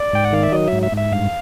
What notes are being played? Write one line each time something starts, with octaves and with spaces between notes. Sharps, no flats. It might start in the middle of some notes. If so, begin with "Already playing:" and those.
Already playing: D5
G#2 G5
F#5
D#3 F5
E5
F#3 D#5
G#2 E5
E5
G#2
E5
G2 F5